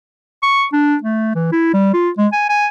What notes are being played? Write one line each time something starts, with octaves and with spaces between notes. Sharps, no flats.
C#6
D4
A3
E3
E4
G3
F4
G#3
G#5
G#5